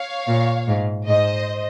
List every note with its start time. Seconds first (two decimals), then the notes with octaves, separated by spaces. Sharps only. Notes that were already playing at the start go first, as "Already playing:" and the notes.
Already playing: C#5 F5
0.27 A#2
0.67 G#2
1.08 G#2 C5 D#5